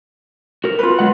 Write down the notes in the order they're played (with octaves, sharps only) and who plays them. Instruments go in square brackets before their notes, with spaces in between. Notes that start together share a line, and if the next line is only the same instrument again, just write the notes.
[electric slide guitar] F#4 A#4
[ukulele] F4 B4
[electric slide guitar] F#3 G#3 F#5